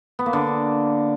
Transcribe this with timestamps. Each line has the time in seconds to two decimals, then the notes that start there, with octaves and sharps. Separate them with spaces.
0.19 B3
0.26 A#3
0.33 D3